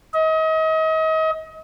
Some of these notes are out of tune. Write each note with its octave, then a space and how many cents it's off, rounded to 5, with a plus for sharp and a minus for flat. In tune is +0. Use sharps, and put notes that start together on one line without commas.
D#5 +35